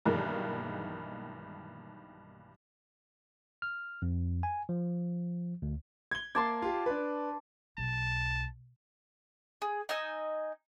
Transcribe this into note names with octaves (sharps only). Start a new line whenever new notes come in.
B1 G2 D#3 E3 G#3 A#3
F6
F2
G#5
F3
D2
G#6 G7
A#3 D5 A5 C6 G#6
F4 G4
D4 B4
B1 A5
G#4
D#4 D#5 G#5 E6